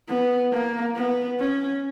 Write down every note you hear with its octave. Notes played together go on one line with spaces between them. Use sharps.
B3
A#3
B3
C#4